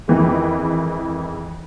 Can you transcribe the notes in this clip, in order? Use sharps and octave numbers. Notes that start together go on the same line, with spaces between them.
F2 D#3 E3 G#3